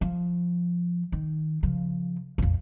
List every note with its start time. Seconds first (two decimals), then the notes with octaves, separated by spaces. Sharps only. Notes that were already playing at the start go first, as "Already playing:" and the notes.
0.01 F3
1.12 D#3
1.63 C#3 F3
2.38 A#1 F2